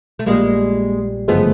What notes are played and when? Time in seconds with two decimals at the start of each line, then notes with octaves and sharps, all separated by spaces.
0.19 A3
0.26 A#1 A#2 G3 G#3 A#3
1.28 G1 F#2 C#3 F3 G#3 A3 B3